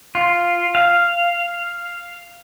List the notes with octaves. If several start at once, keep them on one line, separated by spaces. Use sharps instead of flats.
F4
F5